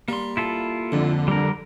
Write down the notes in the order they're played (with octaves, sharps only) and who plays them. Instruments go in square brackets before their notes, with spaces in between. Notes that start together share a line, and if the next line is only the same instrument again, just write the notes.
[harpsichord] G3 [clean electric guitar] A#3 C6
[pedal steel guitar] E4 F4 A4
[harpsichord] F2 [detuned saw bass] D3
[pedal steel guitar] G3 A#4